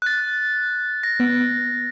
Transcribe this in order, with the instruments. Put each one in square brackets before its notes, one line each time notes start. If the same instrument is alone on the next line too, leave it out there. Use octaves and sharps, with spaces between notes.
[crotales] F#6 A6
A#6
[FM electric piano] B3